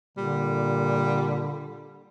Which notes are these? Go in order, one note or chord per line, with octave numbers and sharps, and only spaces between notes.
A#2 D3 G3